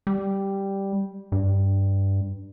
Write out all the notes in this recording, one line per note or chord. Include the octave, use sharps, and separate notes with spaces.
G3
G2